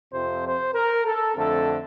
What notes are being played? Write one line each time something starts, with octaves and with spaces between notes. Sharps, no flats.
F2 C3 F3 C4 C5
C5
A#4
A4
F2 D3 A3 C4 A4